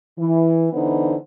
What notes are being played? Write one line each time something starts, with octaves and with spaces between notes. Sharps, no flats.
E3
D3 E3 B3 D#4 C5